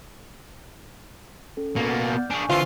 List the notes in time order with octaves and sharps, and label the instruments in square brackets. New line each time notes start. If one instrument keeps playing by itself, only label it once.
[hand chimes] C#4 A4
[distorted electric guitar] B2 A#3 [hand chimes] F5 A6
[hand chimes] F#5 D6
D5 F6 G6
[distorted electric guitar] D4 G#4 [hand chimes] G#5 C#6
[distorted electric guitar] D3 E3 [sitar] F4 [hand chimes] C5